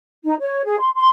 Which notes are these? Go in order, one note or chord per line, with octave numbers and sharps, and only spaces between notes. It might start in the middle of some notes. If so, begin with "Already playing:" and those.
D#4
C#5
G#4
C6
C6